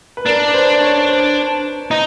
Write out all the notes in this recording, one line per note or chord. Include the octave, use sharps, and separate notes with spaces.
B4
D4 A#4
B4
C5
C#5
C5
D#4